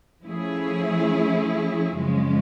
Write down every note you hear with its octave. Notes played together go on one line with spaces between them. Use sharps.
F3 A3 C#4 E4 G#4
F#2 C#3 F3 G#3 C#4